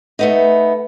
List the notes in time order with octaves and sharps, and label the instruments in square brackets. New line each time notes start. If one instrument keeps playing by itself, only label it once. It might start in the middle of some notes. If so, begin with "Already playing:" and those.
[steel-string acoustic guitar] A3 B3 D#4